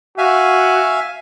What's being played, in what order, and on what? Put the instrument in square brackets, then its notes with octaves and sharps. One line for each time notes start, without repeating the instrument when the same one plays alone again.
[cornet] F#4 [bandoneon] E5 F5 G#5